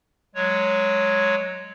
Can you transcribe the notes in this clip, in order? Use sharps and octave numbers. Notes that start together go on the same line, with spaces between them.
F#3 G#3 C#5